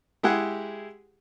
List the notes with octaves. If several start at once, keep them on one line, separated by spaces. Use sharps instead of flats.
G#3 E4 G4 G#4 F#5